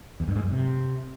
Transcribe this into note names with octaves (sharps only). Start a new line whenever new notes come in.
E2
G2
G#2
F#2
C3